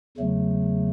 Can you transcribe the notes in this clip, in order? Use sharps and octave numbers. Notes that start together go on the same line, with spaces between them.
E2 C#3 F#3 A3